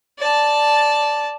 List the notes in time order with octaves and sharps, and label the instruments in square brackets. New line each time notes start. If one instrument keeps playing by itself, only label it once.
[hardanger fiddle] D5 A5